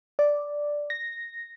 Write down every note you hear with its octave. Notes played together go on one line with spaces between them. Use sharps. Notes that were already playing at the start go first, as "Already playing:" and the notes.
D5
A#6